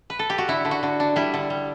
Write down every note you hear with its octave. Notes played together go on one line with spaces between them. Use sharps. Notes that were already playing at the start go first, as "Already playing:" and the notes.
B4
A4
G4
F#4
D3 E4
D3
F#4
D3
D4
G3 E4
D3
G3